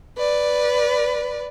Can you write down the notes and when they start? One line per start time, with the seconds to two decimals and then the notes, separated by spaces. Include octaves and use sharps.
0.18 B4 D5